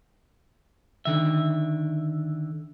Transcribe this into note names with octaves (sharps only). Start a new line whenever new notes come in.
D3 D#3 E5